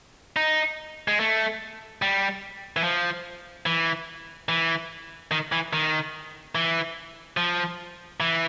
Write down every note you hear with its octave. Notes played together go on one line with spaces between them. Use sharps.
D#4
G#3
A3
G3
E3
F3
E3
E3
D#3
E3
D#3
E3
F3
E3